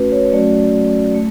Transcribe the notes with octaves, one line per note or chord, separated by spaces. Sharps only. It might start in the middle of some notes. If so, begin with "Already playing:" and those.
Already playing: A3 C#4 F#4 B4
C#5
F#3 A3 C#4 F#4 D5
A3